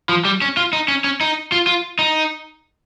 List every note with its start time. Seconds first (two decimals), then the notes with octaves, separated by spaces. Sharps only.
0.09 F3
0.25 G3
0.42 C#4
0.57 F4
0.73 D#4
0.88 C#4
1.04 C#4
1.21 D#4
1.52 F4
1.67 F4
1.99 D#4